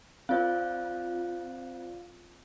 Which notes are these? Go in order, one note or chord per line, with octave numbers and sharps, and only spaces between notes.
C4 F4 C5 D5 F5 F#6